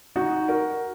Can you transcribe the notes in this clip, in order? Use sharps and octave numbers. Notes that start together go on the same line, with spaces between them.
D#4 F#4
F#4 A#4